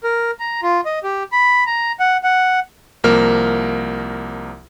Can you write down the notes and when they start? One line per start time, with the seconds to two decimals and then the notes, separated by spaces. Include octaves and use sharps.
0.04 A#4
0.40 A#5
0.63 F4
0.86 D#5
1.04 G4
1.32 B5
1.67 A#5
2.00 F#5
2.24 F#5
3.04 C2 F3 A#3 A#4 F6